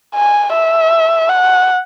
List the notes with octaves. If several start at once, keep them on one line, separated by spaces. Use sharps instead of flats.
G#5
E5
F#5